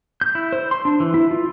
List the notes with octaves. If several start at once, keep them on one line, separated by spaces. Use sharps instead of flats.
G6
E4
C5
C6
D4
E3
E4
F4